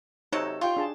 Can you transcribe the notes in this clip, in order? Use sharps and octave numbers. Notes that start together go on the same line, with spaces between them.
C3 F#3 D#4 A4 C#5
F4 G4 G5 C#6
D4 G#4 A5